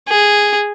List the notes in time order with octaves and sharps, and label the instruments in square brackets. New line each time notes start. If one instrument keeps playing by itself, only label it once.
[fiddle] G#4